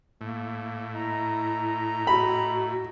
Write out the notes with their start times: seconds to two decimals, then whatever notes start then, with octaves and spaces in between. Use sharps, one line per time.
0.21 A2 A#3
0.94 E4 D#5 A#5
2.07 F#4 B5